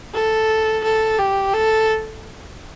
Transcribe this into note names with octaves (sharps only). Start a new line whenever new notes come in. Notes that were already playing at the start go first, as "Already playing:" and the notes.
A4
A4
G4
A4